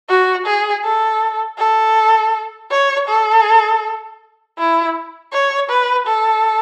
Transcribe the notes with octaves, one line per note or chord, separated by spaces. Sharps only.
F#4
G#4
A4
A4
C#5
A4
E4
C#5
B4
A4